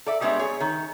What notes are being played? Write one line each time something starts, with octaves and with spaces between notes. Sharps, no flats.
A4 D5 E5
G3 G#3 B3 D4 C#5 E5
G#4 C#5
D#3